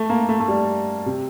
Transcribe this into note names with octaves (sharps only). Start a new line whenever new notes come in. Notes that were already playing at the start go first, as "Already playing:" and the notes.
Already playing: A3
A#3
A3
A3
G3
C3